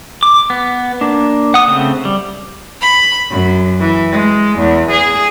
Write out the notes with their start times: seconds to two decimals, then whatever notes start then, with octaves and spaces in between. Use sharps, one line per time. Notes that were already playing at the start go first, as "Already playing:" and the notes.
0.23 D6
0.50 B3
1.01 A#3 D4
1.54 F#5 D#6
1.67 C#3 A3 C4
2.05 G3
2.81 B5
3.30 F#2
3.79 E3
4.11 G#3
4.59 E2
4.90 G#4